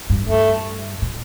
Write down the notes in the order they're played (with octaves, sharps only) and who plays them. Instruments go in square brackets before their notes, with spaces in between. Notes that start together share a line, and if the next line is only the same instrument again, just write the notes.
[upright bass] G2
[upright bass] G2 [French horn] A3
[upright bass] A#2